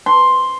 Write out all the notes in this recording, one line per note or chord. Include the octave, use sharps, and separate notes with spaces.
C6